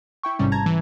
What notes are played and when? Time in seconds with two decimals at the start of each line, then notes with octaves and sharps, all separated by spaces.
0.23 E4 G5 C#6
0.39 A1 G#2 C3 G3 C#4
0.52 A5 A#5 G#6
0.66 E3